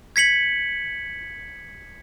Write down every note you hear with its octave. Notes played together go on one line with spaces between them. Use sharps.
G#6 B6 C#7 F#7